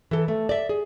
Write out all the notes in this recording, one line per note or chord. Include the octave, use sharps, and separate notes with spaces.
E3 A4
A3
D5 E5
G#4